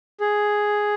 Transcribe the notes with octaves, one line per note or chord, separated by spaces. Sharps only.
G#4